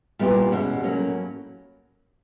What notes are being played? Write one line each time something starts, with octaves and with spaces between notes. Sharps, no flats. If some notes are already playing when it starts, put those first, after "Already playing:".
A#2 G3 B3 E4 G4
E2 B2 G#3 C#4
A2 F#3 A#3 C#4